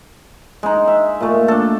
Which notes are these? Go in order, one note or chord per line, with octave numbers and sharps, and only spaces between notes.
G#3 D#4
E5
A#2 A3
D4 A4